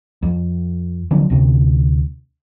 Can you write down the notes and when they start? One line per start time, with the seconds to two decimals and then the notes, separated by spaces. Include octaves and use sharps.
0.23 F2
1.11 D3 F3 F#3 C4
1.30 D2 C3